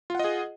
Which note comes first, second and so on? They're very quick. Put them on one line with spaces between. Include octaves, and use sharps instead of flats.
F4 F#5 D#5 G#4